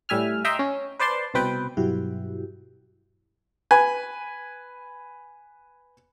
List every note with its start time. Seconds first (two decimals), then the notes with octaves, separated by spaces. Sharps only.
0.09 A2 G3 E5 G#5 F6
0.44 D#5 E5 G5 A#5 C6 D#6
0.59 C#4
0.99 B4 C5 D5 A5 C6
1.34 C2 B2 C4 B4 G5
1.77 G2 B2 F#3 E4 F#4 G4
3.71 B4 G#5